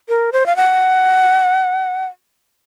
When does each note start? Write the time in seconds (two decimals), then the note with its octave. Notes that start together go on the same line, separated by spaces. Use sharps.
0.09 A#4
0.32 C5
0.46 F5
0.56 F#5